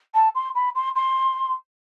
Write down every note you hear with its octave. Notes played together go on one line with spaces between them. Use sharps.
A5
C6
B5
C6
C6